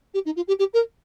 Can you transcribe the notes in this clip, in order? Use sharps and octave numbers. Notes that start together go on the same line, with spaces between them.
G4
D#4
F4
G4
G4
A#4